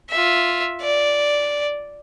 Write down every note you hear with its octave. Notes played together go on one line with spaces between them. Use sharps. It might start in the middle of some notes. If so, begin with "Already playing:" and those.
F4 E5
D5